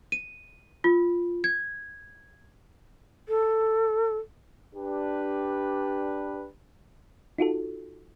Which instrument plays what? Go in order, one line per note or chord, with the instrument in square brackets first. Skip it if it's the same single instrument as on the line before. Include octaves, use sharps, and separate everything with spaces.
[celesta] D#7
F4
G#6
[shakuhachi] A4
[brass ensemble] D4 G4 B4
[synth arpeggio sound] D#4 F4 F#4 A4